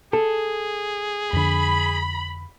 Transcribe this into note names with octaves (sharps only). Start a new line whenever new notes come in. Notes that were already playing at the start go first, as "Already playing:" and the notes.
G#4 A4
F2 D3 B5